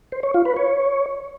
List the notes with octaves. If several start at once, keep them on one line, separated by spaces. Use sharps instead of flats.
C5
C#5
F4
B4
C#5